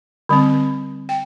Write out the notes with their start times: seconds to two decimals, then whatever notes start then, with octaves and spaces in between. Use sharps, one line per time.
0.29 D3 G3 C4
1.09 G5